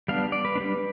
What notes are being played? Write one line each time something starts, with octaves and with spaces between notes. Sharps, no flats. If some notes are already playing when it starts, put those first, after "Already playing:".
G3 B3 D4 F5
D5
B4
G3 B3 D4